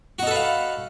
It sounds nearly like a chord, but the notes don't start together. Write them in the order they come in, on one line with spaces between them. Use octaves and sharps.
F#4 D#4 A4 B4 F5